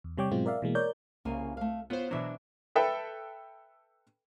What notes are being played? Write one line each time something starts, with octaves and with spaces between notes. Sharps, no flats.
E2
C3 G3 C#5 G5 D6
G#2 B2 F#3 G#3 C4 F4
A#4 D5 E5 F5
B2 E3 G#3 A#3
A#4 C#5 D5 G6
C2 C#3 A#3 G#5
A3 F5
B3 F4 C5 C#5
B2 E3 F#3 D4 E5
A4 B4 E5 G5